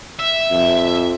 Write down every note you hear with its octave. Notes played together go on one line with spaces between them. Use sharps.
E5
F2